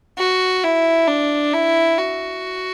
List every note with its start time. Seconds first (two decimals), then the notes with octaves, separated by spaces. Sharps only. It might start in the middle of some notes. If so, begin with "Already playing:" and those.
0.19 F#4
0.64 E4
1.08 D4
1.53 E4
1.98 F#4